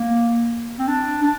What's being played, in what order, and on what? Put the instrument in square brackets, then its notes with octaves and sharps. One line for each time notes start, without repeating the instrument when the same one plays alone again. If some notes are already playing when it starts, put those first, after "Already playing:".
Already playing: [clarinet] A#3
C4
D4
D4